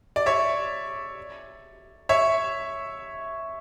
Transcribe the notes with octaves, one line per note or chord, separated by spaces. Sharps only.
D5
C#5 E5
C#5 E5